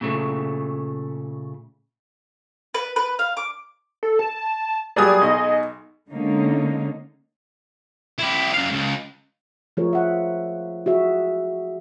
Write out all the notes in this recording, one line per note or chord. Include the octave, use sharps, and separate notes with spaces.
A#2 C#3 A3
B4
B4
F5
D6
A4
A5
F#3 G3 A#3 G#4 D5 G#5 D#6
B1 D#4 D#5
D3 G#3 A#3 C#4 D#4
E4 G4
F#2 F5
C#2
F3 A3 F4 G#4 A#4 C#5
E5 F#5
F#4 G#4 E5